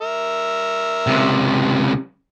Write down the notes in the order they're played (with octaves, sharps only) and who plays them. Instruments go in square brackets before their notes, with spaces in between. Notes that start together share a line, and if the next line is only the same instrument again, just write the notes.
[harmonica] A#4 E5
[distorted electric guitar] C#2 C3